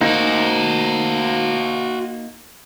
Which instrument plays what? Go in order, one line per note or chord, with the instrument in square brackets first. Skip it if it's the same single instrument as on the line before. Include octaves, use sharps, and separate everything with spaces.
[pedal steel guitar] A#3 D#4 [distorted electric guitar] F#4 C5